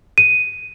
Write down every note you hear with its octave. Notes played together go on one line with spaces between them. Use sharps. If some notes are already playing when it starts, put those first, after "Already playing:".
D#7